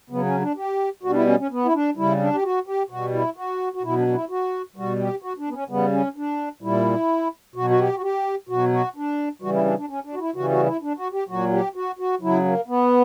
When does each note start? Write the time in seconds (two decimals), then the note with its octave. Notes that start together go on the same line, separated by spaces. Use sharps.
0.10 C#3 F#3 B3
0.26 C#4
0.42 D4
0.57 G4
1.03 B2 G3 F#4
1.10 D4
1.16 E4
1.27 C#4
1.39 C#4
1.51 B3
1.65 E4
1.74 D4
1.97 C#3 G3 E4
2.20 D4
2.33 G4
2.43 F#4
2.67 G4
2.90 B2 G3 F#4
3.13 E4
3.36 F#4
3.74 F#4
3.83 B2 F#3 E4
3.98 D4
4.08 D4
4.14 E4
4.30 F#4
4.76 B2 G3 F#4
4.99 G4
5.22 F#4
5.38 D4
5.49 B3
5.53 C#4
5.70 C#3 G3 B3
5.92 C#4
6.16 D4
6.62 A#2 G3 E4
7.56 B2 F#3 F#4
7.70 F#4
7.79 G4
7.96 F#4
8.03 G4
8.49 B2 F#3 F#4
8.73 F#4
8.96 D4
9.42 C#3 E3 G3 F#4
9.54 E4
9.65 D4
9.78 D4
9.89 C#4
10.04 D4
10.14 F#4
10.20 E4
10.35 C#3 E3 G3 F#4
10.50 F#4
10.66 E4
10.82 D4
10.97 F#4
11.13 G4
11.29 A#2 F#3 F#4
11.52 G4
11.75 F#4
11.99 F#4
12.21 C#3 F#3 E4
12.45 A#3
12.68 B3